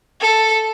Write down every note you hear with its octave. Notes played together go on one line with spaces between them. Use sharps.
A4